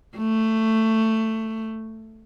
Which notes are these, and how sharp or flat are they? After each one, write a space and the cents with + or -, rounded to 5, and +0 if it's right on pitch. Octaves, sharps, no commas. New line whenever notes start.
A3 +10